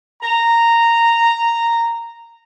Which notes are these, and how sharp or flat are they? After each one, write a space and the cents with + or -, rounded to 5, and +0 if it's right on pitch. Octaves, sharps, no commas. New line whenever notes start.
A#5 -10